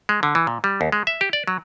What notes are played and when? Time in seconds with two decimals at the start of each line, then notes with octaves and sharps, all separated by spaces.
0.09 G#3
0.23 D3
0.35 E3
0.47 A#2
0.64 G3
0.81 D#2
0.92 G#3
1.07 E5
1.21 G4
1.33 D5
1.47 F#3